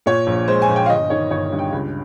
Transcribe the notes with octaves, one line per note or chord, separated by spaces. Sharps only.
A#2 C#5
A#1
G#3 C5
G#5
A#1
G5
F5
G1 D#5
D#3 C#5
G1 C#5
G2
G5
C#2